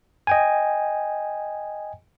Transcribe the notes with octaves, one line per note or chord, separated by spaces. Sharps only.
D#5 G5 G#5